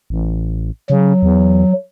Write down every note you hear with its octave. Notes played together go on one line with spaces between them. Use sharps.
A1
C#3 F#3
E2